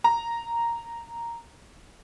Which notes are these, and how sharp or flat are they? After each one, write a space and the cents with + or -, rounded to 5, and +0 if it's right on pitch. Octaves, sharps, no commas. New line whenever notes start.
A#5 -5